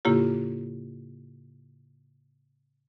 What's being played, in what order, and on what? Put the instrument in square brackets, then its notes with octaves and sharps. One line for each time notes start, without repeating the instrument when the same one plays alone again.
[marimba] A2 C#3 A#3 E4 F4 G4